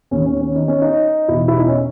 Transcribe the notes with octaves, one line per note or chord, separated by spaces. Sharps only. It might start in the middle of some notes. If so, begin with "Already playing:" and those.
D#2 D#3 C#4
C#4
C#4
D#4
C#4
D#4
E2 B2 E4
E4
D#4
C#4